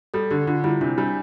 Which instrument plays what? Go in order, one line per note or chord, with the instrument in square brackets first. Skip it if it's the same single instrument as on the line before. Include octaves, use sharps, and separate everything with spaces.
[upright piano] G3 [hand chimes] A4
[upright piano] D3 [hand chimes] G4
[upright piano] D3 [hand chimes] F4
[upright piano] G3 [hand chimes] E4
[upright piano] C3 [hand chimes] D4
[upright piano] G3 [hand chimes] D4